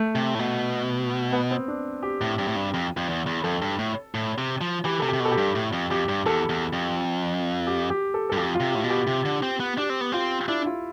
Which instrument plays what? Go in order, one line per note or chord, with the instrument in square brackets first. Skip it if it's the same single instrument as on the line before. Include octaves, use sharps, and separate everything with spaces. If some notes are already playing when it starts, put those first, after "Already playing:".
Already playing: [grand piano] A3
[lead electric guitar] C3
A2
B2
[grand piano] B3
C4
D4
G4
[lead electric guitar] A2
G2
A2
G2
F2
F2
E2
E2
[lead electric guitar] F2 [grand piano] A4
[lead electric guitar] G2
A2
A2
C3
F3
[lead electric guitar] E3 [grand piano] G4
[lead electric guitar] C3 [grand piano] A4
[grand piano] G4
[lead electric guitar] C3
B2
[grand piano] A4
G4
[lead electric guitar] G2
A2
F2
[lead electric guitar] F2 [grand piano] G4
[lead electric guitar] G2
[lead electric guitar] E2 [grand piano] A4
[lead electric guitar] E2
F2
[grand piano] G4
G4
A4
A4
[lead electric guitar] G2
[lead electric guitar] F2 [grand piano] G4
[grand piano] F4
[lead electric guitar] C3
[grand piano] G4
[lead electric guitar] A2
B2
[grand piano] G4
[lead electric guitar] C3
D3
C4
B3
[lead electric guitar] D4 [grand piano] G4
[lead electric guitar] C4
B3
[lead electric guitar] C4 [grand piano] F4
[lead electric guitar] D4 [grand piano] E4
[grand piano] F4